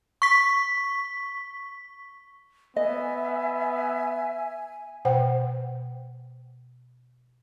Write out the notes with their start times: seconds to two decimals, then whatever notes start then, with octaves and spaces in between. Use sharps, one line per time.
0.22 C#6 B6
2.76 B3 D#5 E5 G#5
5.05 B2 C5 F#5 G5